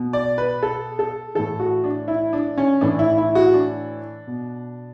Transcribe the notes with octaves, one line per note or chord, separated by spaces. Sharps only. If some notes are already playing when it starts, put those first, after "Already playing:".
Already playing: B2
D5
B4
A4
A4
A2 E3 A4
F#4
D4
E4
D4
C#4
A2 E3 D4
E4
E4
F#4
D4
B2